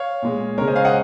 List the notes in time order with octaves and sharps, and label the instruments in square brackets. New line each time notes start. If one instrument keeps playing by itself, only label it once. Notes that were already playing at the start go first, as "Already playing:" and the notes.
Already playing: [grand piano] C#5 F5
A#2 G#3
G#3 A#4 C#5
C#3
C5 D#5
C#5 F5
D#5 F#5